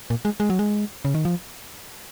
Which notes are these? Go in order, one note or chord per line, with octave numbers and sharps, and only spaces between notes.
A#2
G#3
G#3
F#3
G#3
C#3
D#3
F3